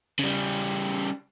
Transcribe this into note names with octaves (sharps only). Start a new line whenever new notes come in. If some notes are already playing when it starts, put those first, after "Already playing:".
C#3 G3